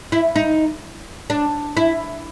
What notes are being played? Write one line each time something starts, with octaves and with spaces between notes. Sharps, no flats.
E4
D#4
D4
E4